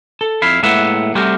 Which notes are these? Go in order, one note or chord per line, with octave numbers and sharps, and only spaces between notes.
A4
F2 E4 F5 B5
A2 G#3 A#3 B4 E5 F#5
G3 A3 C4 F#4 G4 A#4